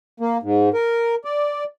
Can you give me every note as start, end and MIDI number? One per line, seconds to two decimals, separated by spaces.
0.20 0.38 58
0.43 0.69 44
0.74 1.15 70
1.25 1.64 74